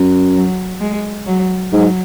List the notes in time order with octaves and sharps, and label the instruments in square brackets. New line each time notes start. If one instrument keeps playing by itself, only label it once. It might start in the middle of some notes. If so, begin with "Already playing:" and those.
Already playing: [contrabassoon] F#2
[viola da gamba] F#3
G#3
F#3
[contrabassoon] G#2 [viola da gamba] F#3